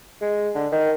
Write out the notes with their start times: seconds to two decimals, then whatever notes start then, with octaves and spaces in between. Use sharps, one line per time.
0.22 G#3
0.55 D3
0.72 D#3